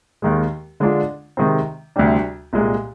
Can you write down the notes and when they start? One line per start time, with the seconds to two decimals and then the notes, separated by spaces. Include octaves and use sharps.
0.22 D#2 D#3 G#3
0.80 D3 G#3 D4 F4
1.37 C3 D#3 G#3 C4
1.96 D2 C3 G3 D4
2.53 C2 A#2 G#3